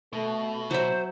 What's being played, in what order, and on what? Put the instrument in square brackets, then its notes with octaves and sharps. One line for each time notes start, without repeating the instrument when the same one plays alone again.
[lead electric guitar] B2 [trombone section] A3
[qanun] F#3 E5 [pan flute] C5